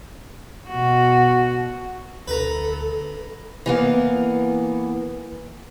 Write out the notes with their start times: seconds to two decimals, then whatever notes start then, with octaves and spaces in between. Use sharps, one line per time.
0.68 B2 F#4
2.28 D2 A4 B4 A#5
3.66 E3 A#3 B3